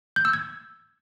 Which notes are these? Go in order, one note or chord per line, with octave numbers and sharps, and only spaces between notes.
G6
E6
G#6